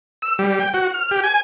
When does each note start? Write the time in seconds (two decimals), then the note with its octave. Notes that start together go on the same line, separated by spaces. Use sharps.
0.22 E6
0.39 G3
0.60 G5
0.74 F#4
0.94 F6
1.11 G4
1.23 G#5